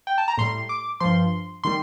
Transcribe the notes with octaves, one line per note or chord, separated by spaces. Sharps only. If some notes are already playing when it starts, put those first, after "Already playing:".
G5
A5
A#5
A2 G3 C6
D6
G2 F3 C6
D#3 G3 C6